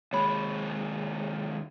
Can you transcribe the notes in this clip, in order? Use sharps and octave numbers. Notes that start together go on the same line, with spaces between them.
D#2 G#3 C#5 B5